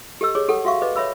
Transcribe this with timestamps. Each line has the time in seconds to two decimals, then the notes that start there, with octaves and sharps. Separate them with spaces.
0.21 G4 A4 D#5 E6
0.35 G#4 C#5 D6
0.48 G4 A4 F#5 D#6
0.65 F#4 E5 F5 C#6
0.82 B4 D#5 D6
0.96 C#5 E5 B5 E6